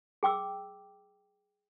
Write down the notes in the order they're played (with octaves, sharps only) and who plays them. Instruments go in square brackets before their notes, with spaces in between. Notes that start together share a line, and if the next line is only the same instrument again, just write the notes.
[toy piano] G#4 G5 D6 E6